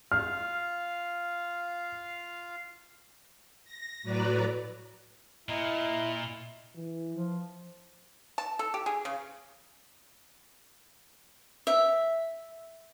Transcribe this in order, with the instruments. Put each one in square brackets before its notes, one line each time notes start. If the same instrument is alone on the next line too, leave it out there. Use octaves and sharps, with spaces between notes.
[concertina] F4 F5 [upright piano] F6
[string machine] A#6
A2 F#3 F#4 B4 D5 A#5
[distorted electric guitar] A#2 [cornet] E4 [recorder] D#5
[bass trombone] E3
[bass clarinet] F3
[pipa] A5
A4
G4
G#4
C#3
[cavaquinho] E5